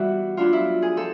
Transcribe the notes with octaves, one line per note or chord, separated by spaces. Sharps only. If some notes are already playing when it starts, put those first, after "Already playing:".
Already playing: E3 G3 B3 E4 F#4
F#3 B3 D4 F4
E4
G#4
F3 A4